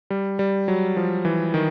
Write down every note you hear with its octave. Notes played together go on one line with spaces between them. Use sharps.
G3
G3
F#3
F3
E3
D#3